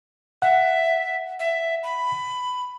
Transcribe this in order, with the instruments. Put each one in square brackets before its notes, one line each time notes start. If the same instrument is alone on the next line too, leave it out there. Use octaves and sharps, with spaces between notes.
[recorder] E5 [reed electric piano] F#5
[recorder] E5
B5